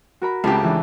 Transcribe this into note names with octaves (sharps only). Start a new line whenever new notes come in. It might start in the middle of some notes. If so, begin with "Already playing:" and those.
F#4 A#4 B5
C#2 C#3 A3 C4 G4
E3 D4